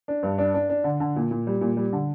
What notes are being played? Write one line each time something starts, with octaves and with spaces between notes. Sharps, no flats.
D4
G2
D4
D4
D4
D3
D3
A#2
A#2
G3
A#2
G3
D3